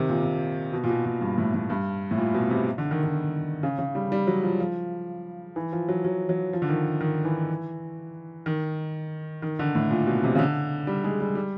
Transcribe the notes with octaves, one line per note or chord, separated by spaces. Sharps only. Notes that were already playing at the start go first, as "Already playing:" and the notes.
Already playing: C3 D#3
A#2
A#2
B2
A#2
B2
A#2
G2
A2
A2
G2
A2
A#2
B2
C3
D3
D#3
D3
C#3
C#3
G3
G3
F#3
F3
F3
E3
F3
F#3
F#3
F#3
F3
D3
D#3
D#3
E3
D#3
D#3
D3
A2
A#2
B2
C3
C#3
D3
G3
G#3
G3
G3